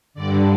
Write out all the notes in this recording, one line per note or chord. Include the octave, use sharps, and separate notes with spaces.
G2 D3 D5